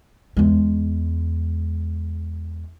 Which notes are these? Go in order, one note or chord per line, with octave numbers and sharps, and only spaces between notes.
E2 G#3